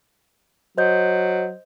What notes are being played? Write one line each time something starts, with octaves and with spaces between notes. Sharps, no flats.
F#3 C5 D#5 G6